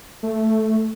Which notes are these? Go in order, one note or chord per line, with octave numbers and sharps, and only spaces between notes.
A3